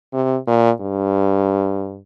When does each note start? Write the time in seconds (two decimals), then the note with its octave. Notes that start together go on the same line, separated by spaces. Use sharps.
0.13 C3
0.47 A#2
0.81 G2